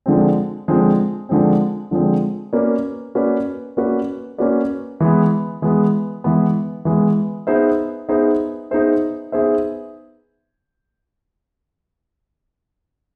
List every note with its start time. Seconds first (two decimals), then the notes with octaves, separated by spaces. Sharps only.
0.06 D3 F3 G#3 C4
0.68 D3 F3 G#3 C4
1.29 D3 F3 G#3 C4
1.91 D3 F3 G#3 C4
2.53 A#3 C#4 F#4 B4 D5
3.15 A#3 C#4 F#4 B4 D5
3.77 A#3 C#4 F#4 B4 D5
4.38 A#3 C#4 F#4 B4 D5
5.00 E3 G#3 B3
5.62 E3 G#3 B3
6.24 E3 G#3 B3
6.85 E3 G#3 B3
7.47 B3 D#4 G#4 C5 E5
8.09 B3 D#4 G#4 C5 E5
8.71 B3 D#4 G#4 C5 E5
9.32 B3 D#4 G#4 C5 E5